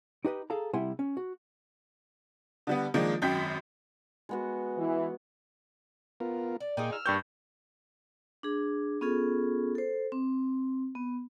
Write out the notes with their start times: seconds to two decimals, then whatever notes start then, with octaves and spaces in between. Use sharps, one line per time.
0.25 D#4 G4 B4 D#5
0.50 G#4 A4 F5 A#5
0.74 C3 G3 E4 F#5 G#5 C6
0.99 C#4
1.17 F#4
2.67 D3 G3 B3
2.94 D#3 F3 G#3 A#3 D4 D#4
3.22 G#1 F#2 G5 G6 B6
4.29 G#3 B3 F#4
4.77 E3
6.20 B3 F4 A#4
6.60 D5
6.77 A#2 D#4 F4 G#4 D5 G5
6.92 E6 F6
7.06 G2 A#3 D4 G4 C#6 G6
8.43 D4 G#4
9.01 B3 C#4 F4 G#4 A4
9.75 A4 C5
10.12 C4
10.95 B3